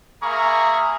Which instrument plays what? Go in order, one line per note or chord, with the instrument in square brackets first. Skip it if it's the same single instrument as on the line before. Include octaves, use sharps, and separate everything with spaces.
[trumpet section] A#3 G#4 E5 A#5 B5 C#6